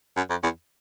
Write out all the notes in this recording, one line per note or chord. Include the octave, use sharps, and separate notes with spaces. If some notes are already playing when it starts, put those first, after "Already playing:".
F#2
F2
E2